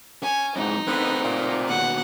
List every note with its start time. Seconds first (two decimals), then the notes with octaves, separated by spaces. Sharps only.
0.23 C#4 G#5
0.56 F2 G#2 D#4
0.87 D3 D#3 A3 B3 C4
1.24 A#2
1.69 D#2 B2 F#5